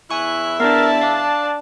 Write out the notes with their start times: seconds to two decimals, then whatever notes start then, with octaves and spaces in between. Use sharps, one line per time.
0.11 E2 E4 E5 G#5 C#6 F#6
0.60 B3 D4 A#4 D5 A5
1.02 D4 F5